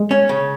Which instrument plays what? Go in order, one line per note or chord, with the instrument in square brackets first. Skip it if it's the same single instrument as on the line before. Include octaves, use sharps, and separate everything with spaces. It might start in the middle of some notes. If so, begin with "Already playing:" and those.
Already playing: [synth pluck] G#3
[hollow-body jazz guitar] C#4
C#3